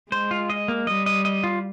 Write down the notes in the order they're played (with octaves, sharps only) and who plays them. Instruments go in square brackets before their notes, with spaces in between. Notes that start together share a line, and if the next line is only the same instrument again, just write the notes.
[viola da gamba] G#3 [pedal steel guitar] C5
[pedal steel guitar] F4
D#5
A#3
[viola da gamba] G3 [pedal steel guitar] D#5
[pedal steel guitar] D#5
D#5
F4